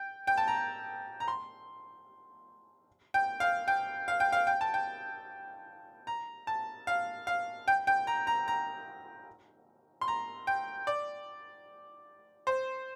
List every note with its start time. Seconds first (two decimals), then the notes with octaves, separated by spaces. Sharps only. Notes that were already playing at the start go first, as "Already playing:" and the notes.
Already playing: G5
0.27 G5
0.38 A5
0.48 A#5
1.20 A#5
1.28 C6
3.14 G5
3.40 F5
3.68 G5
4.08 F5
4.20 G5
4.32 F5
4.47 G5
4.61 A5
4.74 G5
6.07 A#5
6.47 A5
6.87 F5
7.27 F5
7.68 G5
7.87 G5
8.07 A#5
8.27 A#5
8.48 A#5
10.01 C6
10.08 A#5
10.47 G5
10.87 D5
12.47 C5